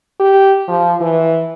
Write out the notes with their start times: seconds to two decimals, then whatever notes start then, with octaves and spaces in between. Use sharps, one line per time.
0.19 G4
0.68 F3
1.00 E3